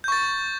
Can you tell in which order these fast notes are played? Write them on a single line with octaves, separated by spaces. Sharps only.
G6 C#6 A6